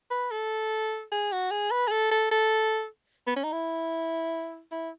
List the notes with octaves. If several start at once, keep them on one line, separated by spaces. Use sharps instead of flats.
B4
A4
G#4
F#4
G#4
B4
G#4
A4
A4
A4
B3
C#4
D#4
E4
E4